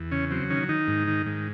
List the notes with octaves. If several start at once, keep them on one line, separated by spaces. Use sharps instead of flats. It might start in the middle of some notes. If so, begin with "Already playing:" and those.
Already playing: E2
C#3 C#4
F#3 C4
D#3 C#4
D#3 D#4
G#2
D#3
G#2